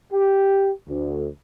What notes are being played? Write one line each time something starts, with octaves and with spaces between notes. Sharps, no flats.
G4
D2